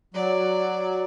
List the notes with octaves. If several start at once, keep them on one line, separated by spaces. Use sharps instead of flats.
F#3 D5